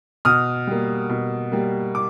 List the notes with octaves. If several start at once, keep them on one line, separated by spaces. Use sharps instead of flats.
B2 D#6 F6
G3 A#3
B2
G3 A#3
D6